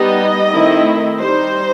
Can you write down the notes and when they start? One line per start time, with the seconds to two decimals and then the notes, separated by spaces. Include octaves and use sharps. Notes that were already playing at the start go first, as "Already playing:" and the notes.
Already playing: G3 B3 D#4 D#5
0.53 D#3 A3 C4 E4
1.20 G3 D#4 C5